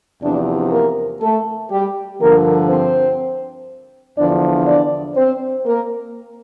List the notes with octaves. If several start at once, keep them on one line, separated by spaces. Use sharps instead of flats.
E2 C3 F3 D4 D5
A#3 A#4
A3 A4
G3 G4
G2 D3 F3 A#3 A#4
C4 C5
E2 D3 F3 D4 D5
D4 D5
C4 C5
A#3 A#4